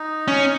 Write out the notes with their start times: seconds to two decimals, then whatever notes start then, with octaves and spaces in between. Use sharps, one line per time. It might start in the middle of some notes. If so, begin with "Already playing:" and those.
Already playing: D#4
0.28 C#4